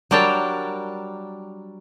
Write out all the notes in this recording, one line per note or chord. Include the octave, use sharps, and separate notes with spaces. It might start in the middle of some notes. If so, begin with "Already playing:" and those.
F#3 G3 D4 A#4 G5 A5